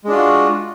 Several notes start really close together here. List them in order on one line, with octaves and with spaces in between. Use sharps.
G#3 D4 F4 F#4